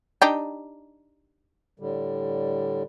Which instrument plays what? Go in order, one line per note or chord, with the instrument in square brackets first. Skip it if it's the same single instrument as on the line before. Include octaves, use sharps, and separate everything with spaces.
[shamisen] D4 D#4 G4
[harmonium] A2 D3 G3